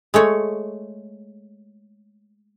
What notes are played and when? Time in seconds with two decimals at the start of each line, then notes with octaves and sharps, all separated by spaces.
0.14 G#3 A3 C#5